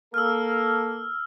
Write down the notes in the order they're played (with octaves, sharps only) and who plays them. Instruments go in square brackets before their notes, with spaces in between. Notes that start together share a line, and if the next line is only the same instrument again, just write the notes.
[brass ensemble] A#3 A4 [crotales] E6 F6